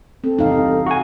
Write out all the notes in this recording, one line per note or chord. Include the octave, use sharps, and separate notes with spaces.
C4 A4
E2 G2 C3 D#4 F5
F#4 G#5